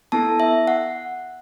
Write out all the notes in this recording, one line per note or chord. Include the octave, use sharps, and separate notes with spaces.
B3 E4 A4 A5
E5
F#5